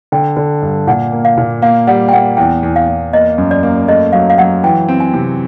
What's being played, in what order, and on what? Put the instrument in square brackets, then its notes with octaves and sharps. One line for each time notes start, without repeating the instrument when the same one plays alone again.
[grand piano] D3 [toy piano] G5
[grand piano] D3
G2
[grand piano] A#2 [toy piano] F#5
[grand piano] A#3
[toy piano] F5
[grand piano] A#2
[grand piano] A#3 [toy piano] F5
[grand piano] G3 [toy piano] F#5
[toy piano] G5
[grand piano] A#3 [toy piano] F#5
[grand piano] E2 [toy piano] G5
[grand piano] E2
[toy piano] F5
[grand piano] E2
[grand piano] A#3 [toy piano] D#5
[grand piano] F#2
[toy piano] D5
[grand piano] A#3
[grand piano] A3 [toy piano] D#5
[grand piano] F#3 [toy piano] F5
[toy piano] F5
[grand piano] F#3 [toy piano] F#5
[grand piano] E3 [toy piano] G5
[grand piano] C4
[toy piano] G#5
[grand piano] C3